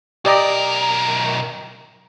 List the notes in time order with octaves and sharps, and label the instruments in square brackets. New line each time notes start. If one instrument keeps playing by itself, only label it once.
[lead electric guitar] B1 A#4 [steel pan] G4 D5 D#5